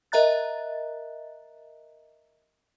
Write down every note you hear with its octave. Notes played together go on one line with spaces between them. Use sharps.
A#4 D#5 E5 A#5 F#6 A6